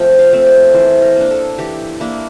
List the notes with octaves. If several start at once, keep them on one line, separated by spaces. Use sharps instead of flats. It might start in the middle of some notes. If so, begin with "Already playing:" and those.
Already playing: F3 A3 C4 C5 G5
F5
A3 C4
D5
E3 C5
A#4
A#3 D4
A4
E3 G4
A#3 D4 E4